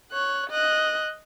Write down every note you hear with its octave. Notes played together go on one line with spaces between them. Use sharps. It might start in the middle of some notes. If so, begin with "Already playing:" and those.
C#5 F#6
D#5 F#6